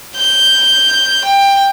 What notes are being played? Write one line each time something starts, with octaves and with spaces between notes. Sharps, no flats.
G6
G5